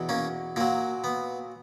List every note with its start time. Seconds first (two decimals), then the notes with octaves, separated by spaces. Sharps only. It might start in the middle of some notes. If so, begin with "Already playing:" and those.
Already playing: E2 B2 F#3
0.09 A#3 C#4
0.56 A#2 F#3 A#3
1.04 B3